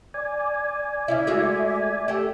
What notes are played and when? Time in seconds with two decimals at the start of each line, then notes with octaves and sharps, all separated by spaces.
0.14 D5 G#5
1.08 C#3 C#4 E4 E5
1.27 G#3 A3 F#4
2.08 A3 G4